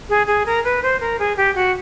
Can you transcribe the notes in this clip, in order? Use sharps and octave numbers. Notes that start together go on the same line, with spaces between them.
G#4
G#4
A#4
B4
C5
A#4
G#4
G4
F#4